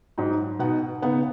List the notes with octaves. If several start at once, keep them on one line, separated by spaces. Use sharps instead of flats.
G#2 F#3 D#4
B2 B3 D#4 F#5
C#3 B3 D#4 F#5